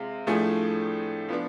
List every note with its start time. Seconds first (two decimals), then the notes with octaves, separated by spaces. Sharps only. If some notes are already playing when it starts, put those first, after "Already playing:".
Already playing: C3 G#3 F4
0.27 A2 F3 A3 D4 G#4
1.28 F3 B3 D4